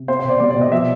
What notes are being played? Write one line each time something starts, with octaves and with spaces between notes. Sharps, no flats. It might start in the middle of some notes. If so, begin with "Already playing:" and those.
Already playing: C3
C4 C5
C5
B2
D5
G3 D5
D5
B2
D#5
F3 E5